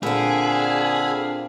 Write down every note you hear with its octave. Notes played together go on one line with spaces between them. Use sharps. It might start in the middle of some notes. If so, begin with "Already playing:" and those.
A#2 D3 C4 D4 G#4 F5 B5 E6